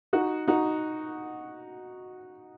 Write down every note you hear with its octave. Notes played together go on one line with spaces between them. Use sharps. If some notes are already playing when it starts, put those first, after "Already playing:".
D#4 F#4
D#4 F#4